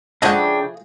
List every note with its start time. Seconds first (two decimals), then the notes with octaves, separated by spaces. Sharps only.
0.22 C#3 F3 A3 D4 G#4 D#5 F#5 G5